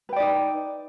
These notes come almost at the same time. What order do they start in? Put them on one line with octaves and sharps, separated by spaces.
B4 G5 D5 D#4